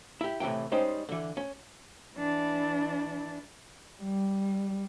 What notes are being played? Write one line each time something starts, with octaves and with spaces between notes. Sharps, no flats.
E4 G4
A2 C3 D#3 E3 G5
G3 G#3 C#4 D#4 C5 G5
D3 E3
C#4
E3 D4
G3